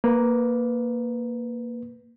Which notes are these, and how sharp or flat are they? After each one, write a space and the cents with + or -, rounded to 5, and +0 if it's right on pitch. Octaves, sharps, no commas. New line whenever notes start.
A#3 +0 B4 +5